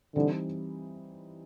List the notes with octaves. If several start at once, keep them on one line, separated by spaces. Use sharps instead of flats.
D3 E3 G3 C4 D#4